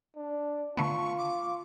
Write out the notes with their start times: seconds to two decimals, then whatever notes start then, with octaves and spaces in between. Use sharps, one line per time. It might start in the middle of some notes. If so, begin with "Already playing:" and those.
0.16 D4
0.77 D3 A3 B3 F4 C#6
1.18 D6